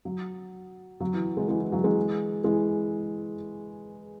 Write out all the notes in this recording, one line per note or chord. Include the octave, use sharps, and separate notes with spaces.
F#3
F#3
E3
E3 G#3
E3 G#3
E3
F#3
E3 G#3
E3 G#3